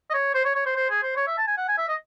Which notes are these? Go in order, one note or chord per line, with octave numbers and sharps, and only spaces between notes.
D#5
C#5
C5
C#5
C#5
C5
C5
G#4
C5
C#5
E5
A5
G#5
F#5
G#5
E5
D#5